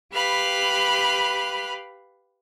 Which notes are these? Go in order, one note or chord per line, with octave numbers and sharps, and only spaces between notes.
G4 B4 F5 B5